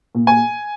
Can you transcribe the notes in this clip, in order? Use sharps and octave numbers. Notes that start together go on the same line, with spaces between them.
A#2
G#5